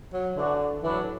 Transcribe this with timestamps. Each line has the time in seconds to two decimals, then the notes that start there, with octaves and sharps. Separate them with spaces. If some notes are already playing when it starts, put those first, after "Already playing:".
0.13 F#3
0.36 D3 E3 D4 F#4
0.83 A2 E3 F#3 D4 B4